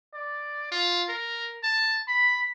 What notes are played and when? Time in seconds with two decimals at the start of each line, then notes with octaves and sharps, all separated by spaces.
0.14 D5
0.71 F4
1.09 A#4
1.64 A5
2.08 B5